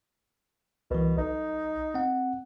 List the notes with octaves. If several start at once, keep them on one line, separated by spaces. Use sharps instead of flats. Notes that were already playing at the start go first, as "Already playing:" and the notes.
C2 B2 E3
B1 D#4
C4 F#5